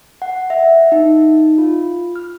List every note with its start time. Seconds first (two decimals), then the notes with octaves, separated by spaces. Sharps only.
0.22 F#5
0.50 E5
0.92 D#4
1.58 F4
2.16 F6